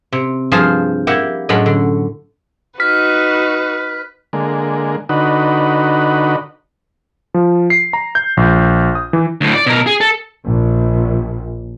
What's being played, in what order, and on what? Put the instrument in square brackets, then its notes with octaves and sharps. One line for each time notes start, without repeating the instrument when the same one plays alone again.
[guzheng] C3
G2 F3 G#4 C5 F5
A#3 E4 G4 F#5
F#2 A2 G#3 C#4 D4 B5
D3
[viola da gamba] D#4 F#4 [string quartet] B4 [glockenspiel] F6 [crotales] B6
[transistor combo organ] D3 G#3 A#3
D3 D#4 F#4 B4
[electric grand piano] F3
C7
A#5
G6
A#1
D#6
E3
[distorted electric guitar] D2 A2
D5
B2 A#4
G#4
A4
[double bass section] A#1